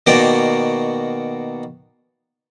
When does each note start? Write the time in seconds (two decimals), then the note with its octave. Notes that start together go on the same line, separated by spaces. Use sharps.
0.07 B2 D#3 A#3 F#4 D5 G5